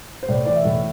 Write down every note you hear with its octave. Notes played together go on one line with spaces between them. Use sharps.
C5
A2 D5
E3 D5
E5
A2